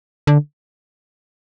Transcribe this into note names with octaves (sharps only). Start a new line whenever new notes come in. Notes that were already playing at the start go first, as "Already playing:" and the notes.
D3